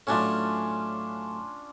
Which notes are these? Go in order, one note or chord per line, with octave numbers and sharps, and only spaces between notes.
A2 F#3 A3 C#4 D4 F4